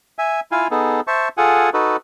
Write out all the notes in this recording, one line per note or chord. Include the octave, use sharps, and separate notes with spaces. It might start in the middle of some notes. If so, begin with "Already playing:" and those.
E5 G#5
E4 F4 F5 G#5
B3 D#4 G#4 A4
C5 E5 A5 C#6
F4 G#4 A4 F#5 G#5
D#4 F#4 A4 B4